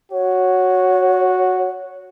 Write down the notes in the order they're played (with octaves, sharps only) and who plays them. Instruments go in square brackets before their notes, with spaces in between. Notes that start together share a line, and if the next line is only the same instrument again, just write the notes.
[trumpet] F#4 [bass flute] C#5